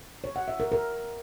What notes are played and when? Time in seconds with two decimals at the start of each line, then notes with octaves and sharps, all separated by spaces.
0.24 C#5
0.36 F#5
0.48 E5
0.60 A#4
0.72 A#4